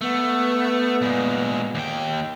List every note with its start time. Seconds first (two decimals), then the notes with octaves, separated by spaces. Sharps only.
0.01 A3 B3
1.01 A#2 G#3
1.75 D#2 G5